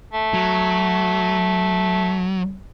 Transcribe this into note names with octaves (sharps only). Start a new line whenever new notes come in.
A3
F#3